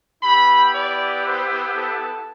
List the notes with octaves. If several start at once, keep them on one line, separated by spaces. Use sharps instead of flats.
B3 E4 G4 B5
D5
C5
A4